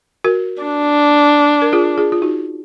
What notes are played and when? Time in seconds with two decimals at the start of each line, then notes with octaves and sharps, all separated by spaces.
0.25 F#4 A#4
0.62 D4
1.62 A#4
1.72 F4 G#4
1.98 F4 G#4
2.12 F4
2.22 D#4 F#4